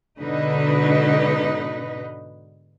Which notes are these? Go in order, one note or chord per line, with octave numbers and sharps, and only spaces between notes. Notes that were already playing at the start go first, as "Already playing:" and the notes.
G#2 B2 D3 D#4 B4